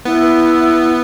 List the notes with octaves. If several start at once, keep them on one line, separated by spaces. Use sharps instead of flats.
B3 E4